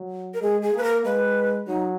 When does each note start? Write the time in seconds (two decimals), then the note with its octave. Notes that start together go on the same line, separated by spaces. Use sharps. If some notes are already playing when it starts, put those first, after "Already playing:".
Already playing: F#3
0.34 A#4
0.41 G#3 G#4
0.62 G#4
0.73 A#3 B4
0.83 A#4
1.04 G#3 B4
1.67 F#3 D#4